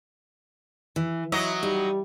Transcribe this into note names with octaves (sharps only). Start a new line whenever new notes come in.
E3
F#3 E4 D#5
G3 D#4